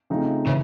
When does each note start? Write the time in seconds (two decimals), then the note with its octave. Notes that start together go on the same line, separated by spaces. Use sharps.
0.10 C#3 F3 A3 C4 D#4
0.47 C#3 E3